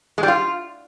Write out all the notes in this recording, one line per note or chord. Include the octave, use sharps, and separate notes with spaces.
G#3
G3
F4